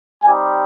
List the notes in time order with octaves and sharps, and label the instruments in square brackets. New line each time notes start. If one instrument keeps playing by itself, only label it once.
[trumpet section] G3 C4 D#4 G4 G#5